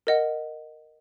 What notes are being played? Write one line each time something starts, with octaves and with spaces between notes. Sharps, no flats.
A#4 D#5 F#5